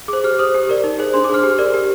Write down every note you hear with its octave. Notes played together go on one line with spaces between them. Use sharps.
G#4 C5 D6
G4 F6
C5 D#6
G4
A#4 D5
D#4
G#4 C5
D4 C6
D6
G#4 C5 F6
G4
A#4 D5
G4